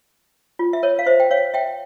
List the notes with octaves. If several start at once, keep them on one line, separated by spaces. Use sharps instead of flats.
F4
E5
A#4 C#5
F5
C5 E5
G5
C#5 F5
E5 G5